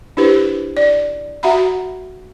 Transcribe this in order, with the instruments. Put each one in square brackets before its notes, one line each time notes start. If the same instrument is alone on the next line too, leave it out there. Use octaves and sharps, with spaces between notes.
[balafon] D4 E4 G4 B4 C5
D5
F#4 E5 F#5 A#5 B5